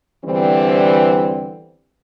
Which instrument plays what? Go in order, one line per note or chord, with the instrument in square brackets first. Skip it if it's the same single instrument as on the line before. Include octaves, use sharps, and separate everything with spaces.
[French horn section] E2 D3 E3 G3 C4